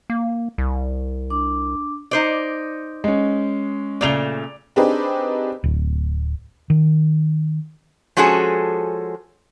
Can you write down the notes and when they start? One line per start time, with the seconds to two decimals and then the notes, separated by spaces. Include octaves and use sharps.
0.10 A#3
0.58 C2
1.30 D4 D6
2.11 D#4 C5 D5
3.04 G#3 C#4
4.01 A#2 C#3 A3 D5 F7 G7
4.76 C4 D4 D#4 G4 G#4 B4
5.64 D1
6.70 D#3
8.17 F3 G#3 C#4 F#4 G#4 A4